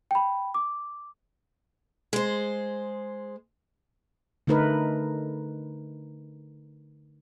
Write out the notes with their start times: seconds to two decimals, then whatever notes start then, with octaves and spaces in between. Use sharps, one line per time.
0.11 G5 B5
0.54 D6
2.13 G#3 C5
4.47 D3 A3 D#4 A#4 B4